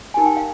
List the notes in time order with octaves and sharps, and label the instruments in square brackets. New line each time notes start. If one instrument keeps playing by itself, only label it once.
[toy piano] D#4 G4 A#4 G#5
G5
F5